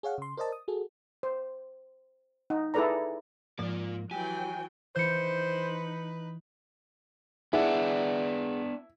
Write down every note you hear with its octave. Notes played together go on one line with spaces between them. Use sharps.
G#4 C#5 F5 F#5
C#3 C6
A#4 C5 D5 D#5 A5
D#6
F#4 G#4 A4
C5
D#4
E4 G#4 A4 B4 D5 A#5
G#2 F3 A#3 F4 D5
E3 F#3 G4 G5 G#5
E3 D#4 B4 C5 G6 C#7
B3 D4 E4 G#4 D5 F#5